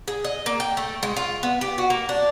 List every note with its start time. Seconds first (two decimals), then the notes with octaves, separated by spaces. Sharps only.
0.08 G#4
0.24 D#5
0.46 A#3
0.60 G5
0.77 A3
1.03 G#3
1.16 F4
1.43 B3
1.61 G4
1.78 F#4
1.90 A#3
2.09 D4